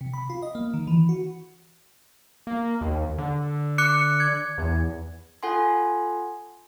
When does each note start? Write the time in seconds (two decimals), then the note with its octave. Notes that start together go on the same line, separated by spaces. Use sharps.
0.01 C3
0.14 B5
0.30 F4
0.42 D#5
0.55 A#3
0.74 D#3
0.87 E3
1.09 F#4
2.47 A#3
2.81 D#2
3.18 D3
3.78 D6 F#6 C#7
4.20 G#6
4.58 E2
5.43 F4 A4 F#5 G#5 C6